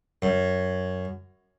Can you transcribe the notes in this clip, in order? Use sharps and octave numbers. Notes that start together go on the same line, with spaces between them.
F#2